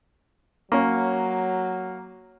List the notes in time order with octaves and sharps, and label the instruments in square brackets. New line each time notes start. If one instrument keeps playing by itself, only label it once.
[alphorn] F#3 [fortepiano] A#3 C#4